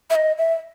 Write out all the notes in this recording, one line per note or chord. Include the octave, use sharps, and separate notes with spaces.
E5
D#5
E5